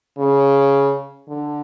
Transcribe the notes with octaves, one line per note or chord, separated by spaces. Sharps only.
C#3
D3